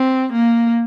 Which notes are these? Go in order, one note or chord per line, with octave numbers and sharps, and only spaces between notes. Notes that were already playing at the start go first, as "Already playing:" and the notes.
Already playing: C4
A#3